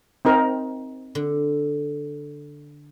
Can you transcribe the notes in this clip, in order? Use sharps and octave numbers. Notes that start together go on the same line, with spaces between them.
C4 D#4 A#4
D3